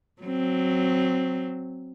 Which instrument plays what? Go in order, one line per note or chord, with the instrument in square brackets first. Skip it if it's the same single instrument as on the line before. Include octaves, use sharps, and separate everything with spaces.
[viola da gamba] F#3 C4